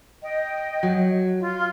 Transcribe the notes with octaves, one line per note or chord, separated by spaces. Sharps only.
D#5 G5
F#3
F4